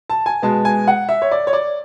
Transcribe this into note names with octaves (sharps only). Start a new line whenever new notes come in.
A5
G#5
B2 G#3 B3 A5
G#5
F#5
E5
C#5
D5
C#5
D5